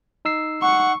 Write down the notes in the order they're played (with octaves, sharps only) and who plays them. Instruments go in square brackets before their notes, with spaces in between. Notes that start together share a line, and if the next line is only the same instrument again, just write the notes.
[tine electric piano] D#4 E6 C7
[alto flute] F#5 [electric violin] C#6